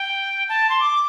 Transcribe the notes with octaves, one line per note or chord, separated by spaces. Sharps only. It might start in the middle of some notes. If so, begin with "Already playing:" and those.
Already playing: G5
A5
C6
D6